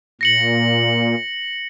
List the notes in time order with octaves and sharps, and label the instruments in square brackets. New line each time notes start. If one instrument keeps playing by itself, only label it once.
[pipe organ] A#2 [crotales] A#6 C#7 F#7